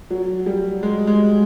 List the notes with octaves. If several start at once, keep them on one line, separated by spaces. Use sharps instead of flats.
F#3
G3
G#3
G#3